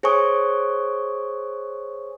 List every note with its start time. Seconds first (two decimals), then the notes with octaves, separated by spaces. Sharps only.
0.03 G#4 C5 C#5 G#5 C#6 D#6